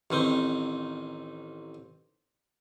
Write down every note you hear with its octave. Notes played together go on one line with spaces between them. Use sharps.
A1 D#3 C4